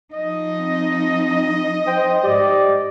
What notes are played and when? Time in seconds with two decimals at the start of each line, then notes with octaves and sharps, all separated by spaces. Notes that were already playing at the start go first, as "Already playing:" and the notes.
0.14 F3 D#4 D#5
0.60 C4
1.87 C5 G5
2.24 G#2 G4 D5